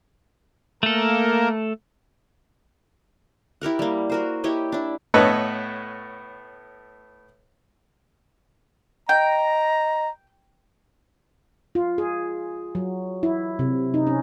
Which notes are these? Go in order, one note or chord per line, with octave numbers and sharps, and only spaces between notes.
A3 A#3 A4 A#4
E4 G4 A#4 F#5
G3 A#3
F#4 A#4 C5
E4 G4 C#5 D#5
D4 E4
A2 B3 A4 B4 C#5 D#5
D#5 G5 A#5
F4
G#4
F#3
E4
C3
D#4
C#4